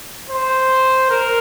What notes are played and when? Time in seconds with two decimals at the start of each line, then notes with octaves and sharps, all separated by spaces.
0.30 C5
1.11 A#4